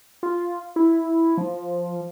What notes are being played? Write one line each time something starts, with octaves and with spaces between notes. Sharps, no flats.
F4
E4
F3